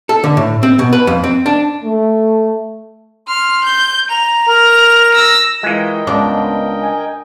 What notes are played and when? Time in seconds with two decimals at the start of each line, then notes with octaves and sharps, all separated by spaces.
0.09 A4
0.24 D3
0.37 A2
0.63 C4
0.79 B2
0.93 B4
1.07 F2
1.24 C4
1.46 D4
1.83 A3
3.28 C6 F6
3.64 G6
4.10 A#5 F7
4.48 A#4 F7
5.14 E6 A#6
5.63 E3 G#3 F4 A#4 D#5 G5
6.07 C#2 B3 D4
6.82 G#5